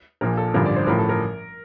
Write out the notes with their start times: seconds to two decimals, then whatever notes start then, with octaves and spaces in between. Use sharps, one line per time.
0.21 A#1 A#2 F3 A#4
0.37 A4
0.54 A1 G2 D3 F3 A#4
0.66 D5
0.76 C5
0.87 A1 A2 F3 A#4
0.99 A4
1.09 A#4